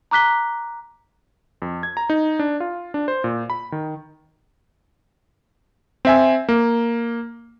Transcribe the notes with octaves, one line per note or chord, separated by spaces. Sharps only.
A#5 D6 F#6 B6 G7
F2
G#6
A#5
D#4
D4
F4
D4
C5
A#2
B5
D#3
C4 E5 G#5
A#3